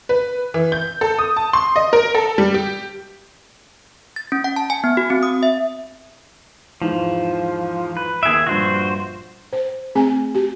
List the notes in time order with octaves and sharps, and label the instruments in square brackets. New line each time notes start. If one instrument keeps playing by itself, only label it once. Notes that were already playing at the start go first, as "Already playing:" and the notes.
[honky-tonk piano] B4
E3
G6
A4
D#6
A5
C6
D#5
A#4
A4
G3
G4
[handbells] A6
C#4
F#5
A5
G#5
B3
F#4
C4
D#6
E5
[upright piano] E2 G#2 [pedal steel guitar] F3
[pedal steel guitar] B4
[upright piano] D#2 D7 [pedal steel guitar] G#4 E5
[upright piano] A#1 G2 [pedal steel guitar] F#4 C5
[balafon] C5
A3 C4 G#4 G#5
F#4 G4